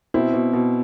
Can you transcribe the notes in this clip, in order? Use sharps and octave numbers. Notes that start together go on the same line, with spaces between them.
B2 C4 E4
B2
B2